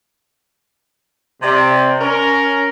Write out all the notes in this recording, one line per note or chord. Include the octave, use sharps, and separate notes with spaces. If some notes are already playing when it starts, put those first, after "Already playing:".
C3 D5
C#4 A#4